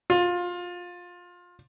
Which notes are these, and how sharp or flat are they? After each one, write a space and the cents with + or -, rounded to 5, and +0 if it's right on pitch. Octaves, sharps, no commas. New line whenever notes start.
F4 +20